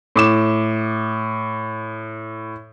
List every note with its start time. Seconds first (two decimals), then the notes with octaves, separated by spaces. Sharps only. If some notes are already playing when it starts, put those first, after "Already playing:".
0.16 A2 D6 E7